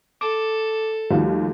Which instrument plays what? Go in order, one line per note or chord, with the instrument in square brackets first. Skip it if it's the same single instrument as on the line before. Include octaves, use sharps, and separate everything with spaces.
[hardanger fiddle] A4 [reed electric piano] D6
[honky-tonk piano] D#2 F4 F#4 [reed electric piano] F3 G3 A3